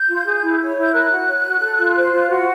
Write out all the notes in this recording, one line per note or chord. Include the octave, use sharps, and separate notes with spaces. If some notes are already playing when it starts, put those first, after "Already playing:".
Already playing: G6
F4
G#4
E4
C#5
E4
G6
A#4 F#6
F#4
C#5
F#4
A4
F4
C5
F4
F#4